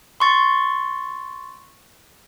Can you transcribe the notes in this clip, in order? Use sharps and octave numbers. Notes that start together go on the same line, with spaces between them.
C6 C#6 A6